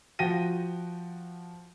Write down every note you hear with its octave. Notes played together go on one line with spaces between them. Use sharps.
F3 F#4 G5 A#6 D#7